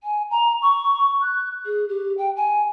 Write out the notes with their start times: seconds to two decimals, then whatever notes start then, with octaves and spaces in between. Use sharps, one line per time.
0.03 G#5
0.30 A#5
0.62 C#6
1.22 F#6
1.65 G#4
1.88 G4
2.17 G5
2.36 G#5